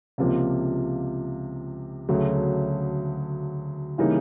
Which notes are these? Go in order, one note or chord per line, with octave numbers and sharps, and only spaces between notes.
C#2 C3 F3 A#3
D2 C#3 F#3 A3
C#3 E3 G3 A#3 D#4